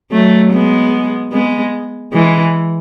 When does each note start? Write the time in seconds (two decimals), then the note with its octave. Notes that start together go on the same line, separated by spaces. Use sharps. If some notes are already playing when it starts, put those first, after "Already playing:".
0.11 F#3 A3
0.52 G#3 B3
1.32 G#3 B3
2.13 E3 G#3